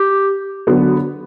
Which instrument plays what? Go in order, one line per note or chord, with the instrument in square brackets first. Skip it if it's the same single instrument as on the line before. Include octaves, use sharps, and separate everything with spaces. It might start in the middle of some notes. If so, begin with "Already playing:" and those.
Already playing: [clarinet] G4
[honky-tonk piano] D3 F#3 B3